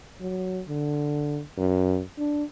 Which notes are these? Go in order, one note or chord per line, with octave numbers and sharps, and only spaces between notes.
F#3
D3
F#2
D4